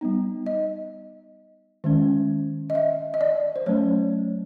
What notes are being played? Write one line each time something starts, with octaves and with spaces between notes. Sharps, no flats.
G3 B3 D#4
D#5
D#3 G#3 C#4
D#5
E5
D#5
D5
C5
F#3 A3 C#4 C#5